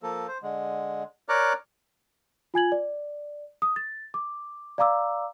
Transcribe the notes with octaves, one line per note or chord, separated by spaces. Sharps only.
F3 A#3 A4
C5
D3 G#3
A#4 C#5 D5 A#5 D6 F#6
F4 G#5 G#6 F#7
D5
D#6
A6
D6
D5 F5 A#5 D6 E6